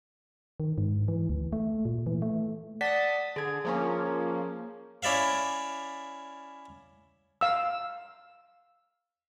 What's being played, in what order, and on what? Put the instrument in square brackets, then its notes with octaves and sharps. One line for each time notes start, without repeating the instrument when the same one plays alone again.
[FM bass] D#3
G#2
E3
D2
A3
A#2
E3
A3
[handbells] D5 F#5 B6 [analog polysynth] A5 D#6
[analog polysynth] D3 [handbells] G#4 G#6
[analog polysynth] F3 A#3 C#4
[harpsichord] C#4 E4 D5 E5 F5
[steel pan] F5 E6